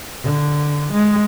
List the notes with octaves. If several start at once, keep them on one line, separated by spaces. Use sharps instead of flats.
D3
G#3